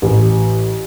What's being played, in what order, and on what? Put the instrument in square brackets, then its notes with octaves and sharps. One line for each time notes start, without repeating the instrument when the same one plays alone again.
[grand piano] A1